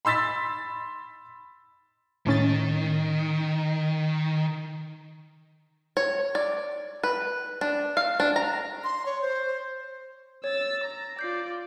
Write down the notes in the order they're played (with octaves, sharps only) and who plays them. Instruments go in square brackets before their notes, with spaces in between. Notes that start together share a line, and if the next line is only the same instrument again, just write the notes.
[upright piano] B5 C6 E6 A6 B6
[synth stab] A2 C#4 A6 [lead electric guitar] D#3
[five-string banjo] C#5
D5
B4
D4
F5
D4
A#5
[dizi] C6
C#5
C5
[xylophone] C#5 [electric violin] E6 A6
[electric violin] A#5
[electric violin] F4 D5 [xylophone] G6 C7